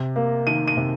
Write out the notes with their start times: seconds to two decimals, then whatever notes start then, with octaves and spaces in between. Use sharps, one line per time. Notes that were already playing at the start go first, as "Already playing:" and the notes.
Already playing: C3
0.16 A#3
0.47 D#3 D#7
0.68 D#7
0.77 C3